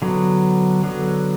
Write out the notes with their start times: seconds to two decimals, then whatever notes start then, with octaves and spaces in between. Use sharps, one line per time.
0.02 D3 F#3 B3
0.83 D3 F#3 B3